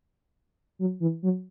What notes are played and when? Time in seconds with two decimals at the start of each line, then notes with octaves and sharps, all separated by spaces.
0.79 F#3
1.00 E3
1.23 F#3